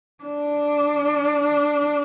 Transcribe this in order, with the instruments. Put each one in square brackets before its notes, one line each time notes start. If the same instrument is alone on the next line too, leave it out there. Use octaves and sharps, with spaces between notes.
[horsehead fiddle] D4